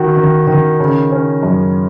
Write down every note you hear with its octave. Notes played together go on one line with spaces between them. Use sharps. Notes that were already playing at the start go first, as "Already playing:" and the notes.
Already playing: D#3 F#4
D#3
D#3
C#3
C#4
F#2